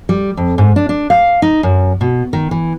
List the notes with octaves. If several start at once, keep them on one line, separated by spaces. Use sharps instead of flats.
G3
F2
G#2
D4
D4
F5
D#4
F#2
B2
D#3
E3